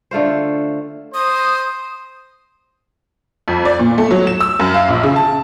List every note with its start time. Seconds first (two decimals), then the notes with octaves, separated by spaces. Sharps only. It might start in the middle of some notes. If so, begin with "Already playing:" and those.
0.11 D3 A3 F4 C5
1.14 C5 D#6
3.48 F2
3.65 D5
3.79 A#2
3.98 A3
4.11 F#3
4.27 E7
4.40 E6
4.59 F#2
4.74 F5
4.89 A#1
5.03 C#3
5.16 A5